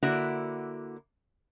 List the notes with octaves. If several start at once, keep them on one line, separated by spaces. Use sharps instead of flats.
D3 A#3 E4 F#4 D5